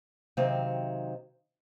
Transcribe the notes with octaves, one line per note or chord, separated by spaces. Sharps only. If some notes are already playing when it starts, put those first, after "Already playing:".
C3 D#3 F#3 C4 F5